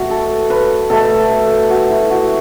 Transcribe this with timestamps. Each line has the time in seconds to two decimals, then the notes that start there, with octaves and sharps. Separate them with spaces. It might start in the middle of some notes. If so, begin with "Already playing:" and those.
Already playing: B2 A3 F#4
0.10 A4
0.50 B4
0.90 B2 A3 A4
1.70 F#4
1.90 E4
2.10 F#4